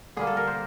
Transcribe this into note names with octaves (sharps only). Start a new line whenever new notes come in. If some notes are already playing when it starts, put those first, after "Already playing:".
D3 G3 A#3 G#4
A4
A#4
C5